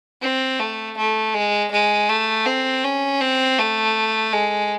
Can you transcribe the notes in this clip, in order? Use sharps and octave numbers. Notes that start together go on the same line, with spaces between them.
C4
A3
A3
G#3
G#3
A3
C4
C#4
C4
A3
G#3